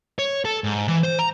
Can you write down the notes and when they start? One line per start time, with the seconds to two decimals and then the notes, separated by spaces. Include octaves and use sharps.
0.19 C#5
0.45 A4
0.64 G#2
0.88 E3
1.03 C5
1.19 A#5